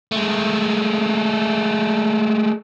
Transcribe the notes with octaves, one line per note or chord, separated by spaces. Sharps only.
G#3 A3